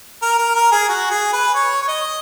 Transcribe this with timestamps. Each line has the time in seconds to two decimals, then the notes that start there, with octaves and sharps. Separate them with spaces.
0.22 A#4
0.38 A#4
0.55 A#4
0.72 G#4
0.89 F#4
1.10 G#4
1.33 B4
1.55 C#5
1.82 C#5
1.88 D#5